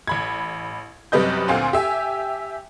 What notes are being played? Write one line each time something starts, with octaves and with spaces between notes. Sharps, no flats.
A1 B5 G#6
F#2 C3 G3 B4 D#5 G6
D2 A#2 C4 F5 G#5 C6
G4 E5 G#5